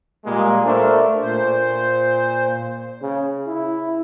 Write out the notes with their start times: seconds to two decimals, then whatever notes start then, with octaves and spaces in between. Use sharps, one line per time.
0.25 A#2 G3 G#3 A#3
0.65 A3 D4 A#4 C5
1.23 A#2 C5
3.02 C#3
3.47 E4